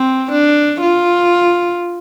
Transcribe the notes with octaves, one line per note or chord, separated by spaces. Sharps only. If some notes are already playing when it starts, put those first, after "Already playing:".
Already playing: C4
D4
F4